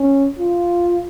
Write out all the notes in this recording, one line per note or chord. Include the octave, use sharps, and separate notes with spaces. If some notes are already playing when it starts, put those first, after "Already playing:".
Already playing: C#4
F4